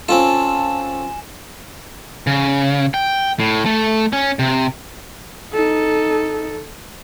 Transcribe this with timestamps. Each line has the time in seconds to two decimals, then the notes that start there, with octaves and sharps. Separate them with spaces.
0.08 C4 C#4 F4 A4 G#5 A5 E7
2.27 C#3
2.94 G5
3.40 A2
3.66 A3
4.13 C#4
4.39 C3
5.54 D#4 A4